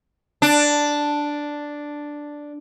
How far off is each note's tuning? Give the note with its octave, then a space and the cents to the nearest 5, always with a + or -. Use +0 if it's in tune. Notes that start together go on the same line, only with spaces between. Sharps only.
D4 +0